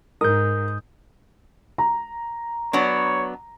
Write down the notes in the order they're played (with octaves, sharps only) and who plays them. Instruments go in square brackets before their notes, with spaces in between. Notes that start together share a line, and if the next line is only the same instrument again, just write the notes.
[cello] G#2 [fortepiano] A#4 [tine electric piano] D#6 G6
[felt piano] A#5
[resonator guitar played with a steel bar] F#3 B3 D4 [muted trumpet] C#5